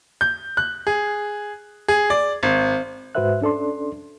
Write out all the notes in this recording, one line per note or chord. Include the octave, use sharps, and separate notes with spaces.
G6
F#6
G#4
G#4
D5
G#1
G#2 F#4 B4 C5 E5 F#6
C#4 D4 A4 D5 C6